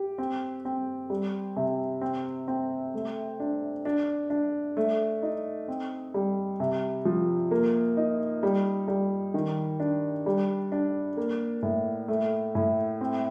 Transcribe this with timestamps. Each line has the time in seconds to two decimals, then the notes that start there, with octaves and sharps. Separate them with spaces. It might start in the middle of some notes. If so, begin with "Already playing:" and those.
Already playing: G4
0.18 C4
0.65 C4
1.10 G3
1.56 C3
2.01 C4
2.48 C4
2.94 A3
3.40 D4
3.85 D4
4.30 D4
4.77 A3
5.23 D#4
5.68 C4
6.14 G3
6.60 C3
7.05 F3
7.51 A#3
7.97 D#4
8.43 G3
8.88 G3
9.34 D#3
9.80 D4
10.26 G3
10.72 D4
11.17 A#3
11.63 A2
12.08 A3
12.55 A2
13.01 C4